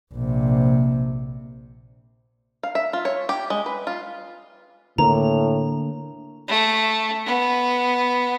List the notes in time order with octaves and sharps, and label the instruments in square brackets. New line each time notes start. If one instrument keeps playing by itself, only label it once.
[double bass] A#1 C3
[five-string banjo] F5
E5
F4
C#5
G4
G#3
B4
F4
[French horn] A2 [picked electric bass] D3 A#3 [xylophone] A#5
[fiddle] A3
B3